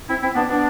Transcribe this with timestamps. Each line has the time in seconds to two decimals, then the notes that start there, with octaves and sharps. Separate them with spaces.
0.09 C4 E4
0.22 C4 E4
0.35 B3 D4
0.48 B3 D4